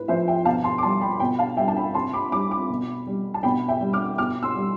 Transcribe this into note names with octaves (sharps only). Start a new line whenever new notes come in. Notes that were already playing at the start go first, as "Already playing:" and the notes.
Already playing: A2 B4
F3 C5 E5
E5 G5
B2 F5 A5
A5 C6
D6
G3 A5 C6
G5 B5
B2 G5 B5
F5 A5
G3 E5 G5
A5
G5 B5
C3 A5 C6
B5 D6
G3 B5 D6
B5 D6
B2
G3
A5
B2 G5 B5
E5 G5
G3
D6 F6
B2 D6 F6
C6 E6
G3